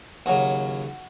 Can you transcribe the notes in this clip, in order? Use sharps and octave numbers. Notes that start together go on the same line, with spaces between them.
D#2 C#3 F#3 F#4